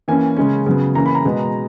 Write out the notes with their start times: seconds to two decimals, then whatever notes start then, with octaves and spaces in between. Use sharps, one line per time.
0.08 E3 A#3 C#4 G#5
0.37 C#3 G#3 C#4
0.66 C#3 F#3 B3
0.95 E3 A#3 C#4 A#5
1.06 B5
1.15 A#5
1.25 B2 G#3 B3